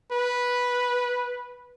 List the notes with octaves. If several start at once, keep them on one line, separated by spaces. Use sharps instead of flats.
B4